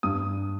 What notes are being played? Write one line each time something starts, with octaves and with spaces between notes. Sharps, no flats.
G2 D#6